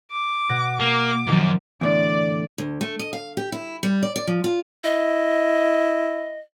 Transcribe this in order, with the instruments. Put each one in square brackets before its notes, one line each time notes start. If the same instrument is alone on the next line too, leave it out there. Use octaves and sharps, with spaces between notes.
[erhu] D6
[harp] B2 F#6 A#6
[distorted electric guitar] A#3 [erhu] D6
[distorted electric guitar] B1 F#2 [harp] D#3 F3 A#3
[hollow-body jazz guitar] E2 A2 D3 [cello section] D5
[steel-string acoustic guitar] D2
A3
D#5
F5
G4
E4
G3
D5
D5
F3
F4
[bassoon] E4 [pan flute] D#5